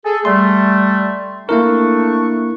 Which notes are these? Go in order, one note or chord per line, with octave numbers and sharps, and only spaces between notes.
G#4 A4
G3 A3 C6
A3 A#3 D4 E4 A#4 C#6